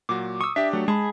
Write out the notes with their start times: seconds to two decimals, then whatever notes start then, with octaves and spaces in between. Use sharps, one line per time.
0.09 A#2 F#3 F#4 D6
0.41 C#6 D#6 E6
0.56 D4 G4 E5
0.73 F#3 A3
0.88 G#3 G#4 A5 B5